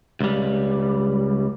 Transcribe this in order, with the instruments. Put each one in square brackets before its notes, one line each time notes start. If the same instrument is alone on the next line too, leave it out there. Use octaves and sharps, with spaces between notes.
[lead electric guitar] C#2 G3